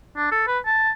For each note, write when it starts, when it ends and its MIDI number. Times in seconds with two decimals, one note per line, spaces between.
0.17 0.29 62
0.32 0.47 69
0.47 0.59 71
0.66 0.91 81